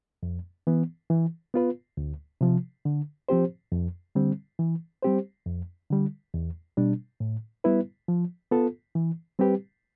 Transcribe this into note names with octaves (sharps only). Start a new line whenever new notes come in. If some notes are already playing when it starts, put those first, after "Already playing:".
F2
E3 B3
E3
B3 F4 B4
D2
C3 F3
D3
F3 C4 G4 C5
F2
D3 G3 C4
E3
G3 C4 G4 C5
F2
D3 G3
E2
B2 G3 D4
A2
G3 B3 E4 B4
F3
B3 F4 A4
E3
G3 C4 G4 B4